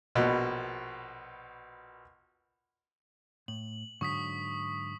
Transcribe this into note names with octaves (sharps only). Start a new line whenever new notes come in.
A#1 B2
A2 F#7
G#2 D3 F#3 C#6 D#6 B6